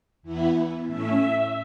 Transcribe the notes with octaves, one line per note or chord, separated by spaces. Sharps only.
E2 E3 B3 E4
A2 A3 C#4 E5